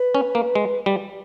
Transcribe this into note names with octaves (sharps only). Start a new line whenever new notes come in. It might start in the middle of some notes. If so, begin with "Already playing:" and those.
Already playing: B4
C#4
A#3
G#3
G3